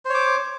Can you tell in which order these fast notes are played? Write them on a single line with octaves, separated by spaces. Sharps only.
C5 C#5 D6